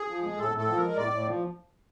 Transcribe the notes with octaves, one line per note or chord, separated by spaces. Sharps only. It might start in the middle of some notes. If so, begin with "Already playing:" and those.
Already playing: G#4
F3
G#3
A2 A4
A2
A4
F3
A#4
G#3
A2 D5
A2
F3